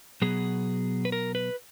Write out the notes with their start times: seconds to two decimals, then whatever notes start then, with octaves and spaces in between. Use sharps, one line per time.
0.22 B2 F#3 B3 G#4
1.05 B4
1.12 A#4
1.35 B4